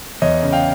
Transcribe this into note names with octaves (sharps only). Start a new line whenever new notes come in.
E2 C#5 D#5
C#3
F5 G5